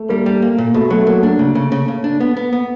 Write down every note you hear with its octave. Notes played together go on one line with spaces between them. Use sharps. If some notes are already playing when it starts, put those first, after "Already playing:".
Already playing: A3
G3 A#3
G3
A#3
A#2
B2 A3
F#3 A3
F#3 A#3
A3 D4
C#3
C#3
C#3
C#3
D4
B3
B3
B3